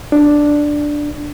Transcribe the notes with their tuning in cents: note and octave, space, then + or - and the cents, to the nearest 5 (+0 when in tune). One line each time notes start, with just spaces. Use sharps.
D4 +0